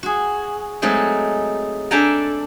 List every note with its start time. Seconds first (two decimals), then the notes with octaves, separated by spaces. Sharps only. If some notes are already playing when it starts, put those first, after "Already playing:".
0.03 F#4 G#4
0.82 F#3 G#3 A3 C4 D#4
1.91 D4 A4 E5 G5 G#5 A#5